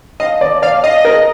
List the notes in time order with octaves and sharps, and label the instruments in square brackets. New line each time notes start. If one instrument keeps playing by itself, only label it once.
[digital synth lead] D#5 [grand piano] F5
[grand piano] D5
[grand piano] D5 [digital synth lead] F5
[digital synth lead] D#5 [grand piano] F5
[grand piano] A#4